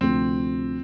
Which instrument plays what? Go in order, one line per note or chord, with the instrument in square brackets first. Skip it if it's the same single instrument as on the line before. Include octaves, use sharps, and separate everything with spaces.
[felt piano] D2 C3 F3 [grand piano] C4